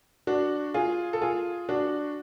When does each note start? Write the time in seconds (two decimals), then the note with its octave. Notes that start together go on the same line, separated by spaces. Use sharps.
0.27 D4 F#4
0.74 F4 G#4
1.13 A4
1.22 F4 G#4
1.69 D4 F#4